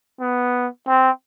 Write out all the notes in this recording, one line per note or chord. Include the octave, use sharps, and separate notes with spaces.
B3
C4